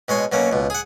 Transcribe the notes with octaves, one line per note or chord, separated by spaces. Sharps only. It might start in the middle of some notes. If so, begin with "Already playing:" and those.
B2 G#3 C#5 C6
B2 F#3 A#3 C#4
C#2 B2
G#4 F#5